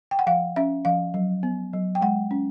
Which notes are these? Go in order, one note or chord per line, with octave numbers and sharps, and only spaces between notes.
G5
F#5
F3 F5
C#4 E5
F3 F5
F#3
B3
F#3
G5
G#3 F#5
C#4